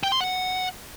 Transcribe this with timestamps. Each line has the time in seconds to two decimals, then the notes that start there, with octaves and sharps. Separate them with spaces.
0.04 G5
0.12 C6
0.21 F#5